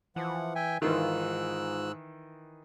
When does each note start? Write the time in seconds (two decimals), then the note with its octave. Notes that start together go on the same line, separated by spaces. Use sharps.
0.16 E3 F3 F#5
0.55 E5 G5 G#5
0.82 G#2 D#3 E3 F4 E6 F#6